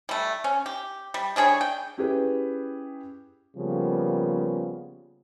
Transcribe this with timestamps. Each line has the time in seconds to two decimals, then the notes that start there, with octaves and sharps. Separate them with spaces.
0.09 G3 A3
0.44 C#4
0.66 G4
1.14 G3
1.36 G3 D4 G#4 C#5
1.61 G5
1.98 C#4 E4 G4 G#4 B4
3.56 C#3 F3 G3 A#3 B3